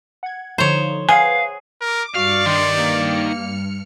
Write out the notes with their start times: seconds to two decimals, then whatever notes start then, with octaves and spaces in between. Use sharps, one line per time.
0.23 F#5 G#6
0.58 D3 F3 D#4 C5 C#5
1.09 G#4 B4 F5 F#5 G#5
1.81 A#4 D6
2.16 G2 F#4 D5 F5 F6 C#7
2.46 D#3 C6
2.78 A#3